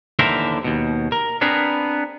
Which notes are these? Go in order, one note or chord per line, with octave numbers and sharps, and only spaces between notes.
D#2 D3 E3 A#4 C5 E5
D#2 B2
A#4
B3 C4 D4 G#4 A#4 B4